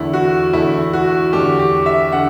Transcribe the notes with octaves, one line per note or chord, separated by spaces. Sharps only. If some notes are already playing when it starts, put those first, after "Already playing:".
Already playing: E2 D3 A3 E4
F#4
E2 D3 A3 E4
F#4
E2 D3 A3 G4
G4
E5
D3 F#5